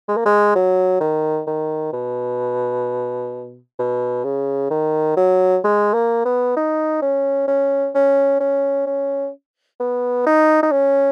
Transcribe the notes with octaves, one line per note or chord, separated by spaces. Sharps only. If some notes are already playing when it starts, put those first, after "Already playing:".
G#3
A#3
G#3
F#3
D#3
D#3
B2
B2
C#3
D#3
F#3
G#3
A#3
B3
D#4
C#4
C#4
C#4
C#4
C#4
B3
D#4
D#4
C#4